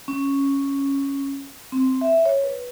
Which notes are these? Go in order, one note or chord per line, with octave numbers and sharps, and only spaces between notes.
C#4
C4
E5
C#5
B4